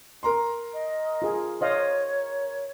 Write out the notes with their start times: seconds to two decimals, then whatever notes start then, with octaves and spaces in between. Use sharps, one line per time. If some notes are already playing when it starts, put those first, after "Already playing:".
0.23 A#4 A#5 C6
0.74 D#5
1.22 F4 G#4
1.61 C5 C#5 D#5 F5